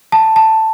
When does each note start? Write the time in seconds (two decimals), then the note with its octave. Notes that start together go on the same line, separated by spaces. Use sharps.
0.12 A5
0.36 A5